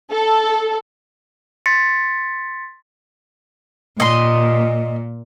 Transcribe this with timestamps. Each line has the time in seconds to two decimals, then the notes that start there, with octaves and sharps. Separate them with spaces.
0.12 A4
1.66 C6 A6 B6 C#7
4.00 A#2 D#5 C6